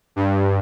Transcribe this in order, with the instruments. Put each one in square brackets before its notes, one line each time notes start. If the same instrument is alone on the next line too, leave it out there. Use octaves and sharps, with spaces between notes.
[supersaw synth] G2